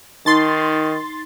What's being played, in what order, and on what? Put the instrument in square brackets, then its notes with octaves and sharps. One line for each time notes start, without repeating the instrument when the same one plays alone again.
[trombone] D#3 [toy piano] D#4 [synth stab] C6 A6